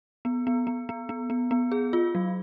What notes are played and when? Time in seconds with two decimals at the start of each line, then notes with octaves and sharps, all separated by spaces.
0.25 B3
0.47 B3
0.67 B3
0.89 B3
1.09 B3
1.30 B3
1.51 B3
1.72 G#4
1.93 F4
2.15 F#3